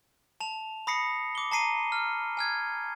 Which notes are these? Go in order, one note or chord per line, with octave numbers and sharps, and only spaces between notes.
A5 F7
B5 D#6 A#6 C7 C#7
D6 G7
A5 A#5 C7 D#7
F6
G#5 F6 G#6